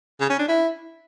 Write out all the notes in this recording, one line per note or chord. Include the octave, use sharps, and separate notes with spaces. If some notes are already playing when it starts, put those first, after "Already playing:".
C#3
C#4
D4
E4